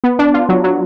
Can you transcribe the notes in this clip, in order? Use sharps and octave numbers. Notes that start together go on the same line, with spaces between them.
B3
D4
F4
F#3
F#3